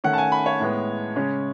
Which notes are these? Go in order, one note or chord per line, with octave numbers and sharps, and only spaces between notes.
D#3 A3 C#4 F#5
A5
G#5
B5
C#5
A2 G#3 B3
C#3 G#3 C#4